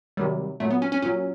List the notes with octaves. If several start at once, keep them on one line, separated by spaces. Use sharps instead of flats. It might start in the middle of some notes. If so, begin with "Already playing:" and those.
C3 D#3 F#3 G3
A#2 F#3 A3
B3
C#4
C#4
A#2 F#3 C#4